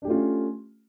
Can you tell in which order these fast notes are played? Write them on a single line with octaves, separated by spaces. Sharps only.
D4 G4 A3 F4 C#4